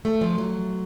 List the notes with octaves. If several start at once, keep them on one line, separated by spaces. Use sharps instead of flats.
A3
F3
F#3